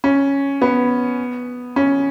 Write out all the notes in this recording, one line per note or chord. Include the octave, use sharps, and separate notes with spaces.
C#4
B3
C#4